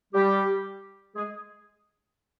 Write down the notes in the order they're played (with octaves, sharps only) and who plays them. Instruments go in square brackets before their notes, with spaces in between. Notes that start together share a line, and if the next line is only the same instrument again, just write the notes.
[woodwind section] G3 G4
G#3 G#4